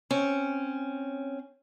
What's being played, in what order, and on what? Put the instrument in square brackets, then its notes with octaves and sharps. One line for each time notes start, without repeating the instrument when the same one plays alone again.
[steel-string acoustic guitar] C4 C#4